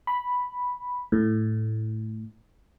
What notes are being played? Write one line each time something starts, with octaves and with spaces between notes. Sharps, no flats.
B5
A2